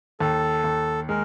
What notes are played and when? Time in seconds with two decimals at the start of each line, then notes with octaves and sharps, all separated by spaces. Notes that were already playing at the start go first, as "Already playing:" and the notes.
0.20 D#2 A4
0.64 D#2
1.09 G#3 A#4